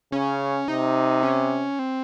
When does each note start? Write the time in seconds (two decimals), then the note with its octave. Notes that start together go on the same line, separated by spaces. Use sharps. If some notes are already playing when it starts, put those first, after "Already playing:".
0.12 C#3 C#4
0.68 C3 D#4
1.23 C#4
1.79 C4